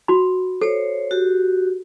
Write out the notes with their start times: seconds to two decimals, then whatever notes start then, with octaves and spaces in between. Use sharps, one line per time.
0.08 F#4 B5
0.62 A4 C5 C#5
1.11 F#4 G4